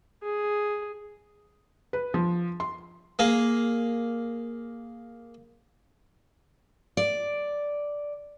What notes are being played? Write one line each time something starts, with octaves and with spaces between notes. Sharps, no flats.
G#4
B4
F3
C6
A#3 G#4
D5